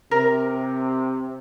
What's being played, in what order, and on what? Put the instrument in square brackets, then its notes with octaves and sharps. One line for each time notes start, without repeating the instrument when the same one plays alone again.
[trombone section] C3 [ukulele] A#4